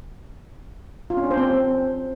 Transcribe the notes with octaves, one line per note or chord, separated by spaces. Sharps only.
F4
C#4
D4
C5
C4